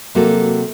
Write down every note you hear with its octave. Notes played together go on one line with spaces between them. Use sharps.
C3 F#3 A#3 F#4 A4